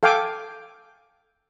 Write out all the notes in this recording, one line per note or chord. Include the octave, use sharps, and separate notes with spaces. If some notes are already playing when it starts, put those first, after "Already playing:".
A4 F5 G5 G#5 D6